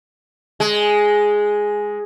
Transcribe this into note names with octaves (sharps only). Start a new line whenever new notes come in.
G#3